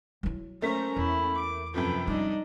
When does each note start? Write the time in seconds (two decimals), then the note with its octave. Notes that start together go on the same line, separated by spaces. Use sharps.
0.23 F#3 E4
0.62 A3 A#3 C#4 C5 A#5 B6
0.97 E2 E4
1.35 D6
1.74 F#2 C3 F3 A4 B4 G5
2.07 G3 D4 D#4 D#5